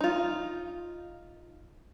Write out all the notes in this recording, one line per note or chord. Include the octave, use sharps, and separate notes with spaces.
D#4 F4